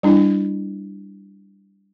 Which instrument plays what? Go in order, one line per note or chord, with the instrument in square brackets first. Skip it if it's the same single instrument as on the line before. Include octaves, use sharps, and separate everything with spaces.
[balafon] G3 D4 E4